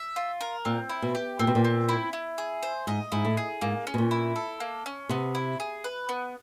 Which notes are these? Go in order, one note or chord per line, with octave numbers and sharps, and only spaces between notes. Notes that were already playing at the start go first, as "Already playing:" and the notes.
Already playing: E5
F4
A#4
A#2 C4
E4
B2
G4
A#2 C4
B2
A#2
C4
E4
E4
G#4
C5
G#2 D#5
G#2 E4
A2
G#4
G#2 A#3
C#4
B2
A#2
E4
A4
A#3
C#4
C3 B3
E4
G#4
B4
B3